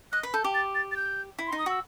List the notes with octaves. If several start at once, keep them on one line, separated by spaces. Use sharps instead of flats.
D#5 F#6
B4
A4 G6
G4
A6
A6
A6
G6
E4
C6
D#4
D#6
F#4 E6